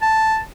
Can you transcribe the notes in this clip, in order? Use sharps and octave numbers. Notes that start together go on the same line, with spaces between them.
A5